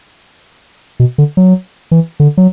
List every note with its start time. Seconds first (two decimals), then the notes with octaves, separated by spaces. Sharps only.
1.00 B2
1.18 D3
1.37 F#3
1.91 E3
2.20 D3
2.37 F#3